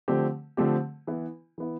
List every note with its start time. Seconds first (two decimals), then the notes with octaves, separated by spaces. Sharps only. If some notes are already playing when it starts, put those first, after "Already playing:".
0.08 D3 F3 A3 C4 G4
0.57 D3 F3 A3 C4 G4
1.07 E3 B3 E4
1.58 E3 B3 E4